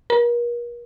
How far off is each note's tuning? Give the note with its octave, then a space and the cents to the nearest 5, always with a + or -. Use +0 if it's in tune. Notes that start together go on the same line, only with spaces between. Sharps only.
A#4 +40